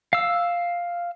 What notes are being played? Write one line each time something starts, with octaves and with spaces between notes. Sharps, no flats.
F5 E6